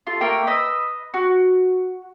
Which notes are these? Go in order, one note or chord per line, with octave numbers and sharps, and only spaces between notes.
F4 A4
A3 A#3 A#4 G5
B4 D#5 E6
F#4